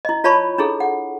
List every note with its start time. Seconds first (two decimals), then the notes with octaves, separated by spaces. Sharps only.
0.05 E4 D#5
0.24 F4 C#5 D5 A5 B5 C#6
0.58 D4 E4 G#4 A4
0.80 F#5